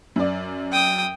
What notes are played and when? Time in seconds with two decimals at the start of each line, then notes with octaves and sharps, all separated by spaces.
0.16 F#2 D5
0.72 G5 D#6